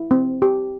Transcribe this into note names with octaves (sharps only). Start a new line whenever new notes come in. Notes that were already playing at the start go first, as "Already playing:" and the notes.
Already playing: E4
C4
G4